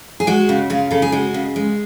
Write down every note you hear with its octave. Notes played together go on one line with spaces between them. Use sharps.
G#4
G#3 F#4
C#3
C#3 F4
C#3 A4
G#4
G#3 F#4
C#3
G#3